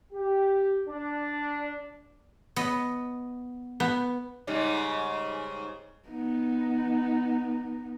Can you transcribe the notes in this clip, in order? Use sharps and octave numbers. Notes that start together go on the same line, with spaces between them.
G4
D4
B3 D#5
B3
G#2 C#3 G3
B3 D#4